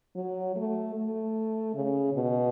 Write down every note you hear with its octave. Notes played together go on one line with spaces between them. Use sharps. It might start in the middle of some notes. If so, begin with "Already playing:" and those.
F#3
A3
A3
C#3
B2